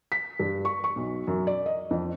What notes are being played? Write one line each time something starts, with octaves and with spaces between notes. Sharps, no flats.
B6
G2
C#6
C#6
B1
F#2
D5
D#5
F2